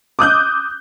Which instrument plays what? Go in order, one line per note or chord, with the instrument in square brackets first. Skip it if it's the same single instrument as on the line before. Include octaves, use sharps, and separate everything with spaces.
[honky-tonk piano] D6 D#6 F#6 G6